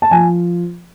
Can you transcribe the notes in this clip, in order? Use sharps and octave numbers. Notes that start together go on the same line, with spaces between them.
A5
F3 G#5